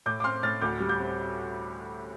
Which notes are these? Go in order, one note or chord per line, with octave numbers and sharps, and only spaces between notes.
A2 D6 G6
D6
C4 C6 F6
A2 F6 A6
D2 D6 G6
G3
D6 G6
C4